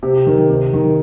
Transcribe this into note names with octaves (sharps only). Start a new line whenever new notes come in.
C3 G4
D#3
C3
D#3